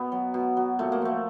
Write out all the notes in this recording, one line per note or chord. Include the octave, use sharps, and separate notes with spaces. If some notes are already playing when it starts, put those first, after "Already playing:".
Already playing: B2 B3
F#3
B2
F#3
A#2 A3
A#3
F3 A3